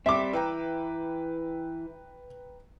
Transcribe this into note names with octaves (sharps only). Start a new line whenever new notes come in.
G3 C4 E5 D6
E3 B4 G5 A#5